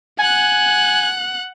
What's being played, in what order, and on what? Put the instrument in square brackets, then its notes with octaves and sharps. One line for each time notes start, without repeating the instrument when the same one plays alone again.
[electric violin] F#5 F#6 [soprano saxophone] G#5